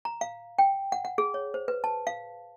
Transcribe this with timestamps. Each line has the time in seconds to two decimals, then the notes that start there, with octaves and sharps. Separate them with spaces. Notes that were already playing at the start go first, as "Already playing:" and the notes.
0.05 A#5
0.21 F5
0.59 G5
0.92 F#5
1.05 F#5
1.18 G#4
1.34 C#5
1.54 C5
1.68 B4
1.84 A5
2.07 F5